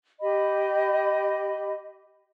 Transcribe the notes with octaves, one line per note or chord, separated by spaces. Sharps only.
G4 D#5 B5